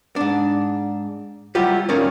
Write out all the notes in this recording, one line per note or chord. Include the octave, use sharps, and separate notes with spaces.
G#2 D4
F#3 G3 E4 F4 G4
D#2 A2 D#3 A#3 C#4 D5